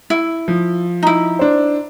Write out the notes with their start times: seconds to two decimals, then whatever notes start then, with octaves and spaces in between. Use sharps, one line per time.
0.10 E4
0.48 F3
1.03 D#4 E4
1.39 D4 C5